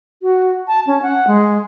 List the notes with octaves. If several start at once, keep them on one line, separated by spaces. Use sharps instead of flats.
F#4
A5
C#4
F#5
G#3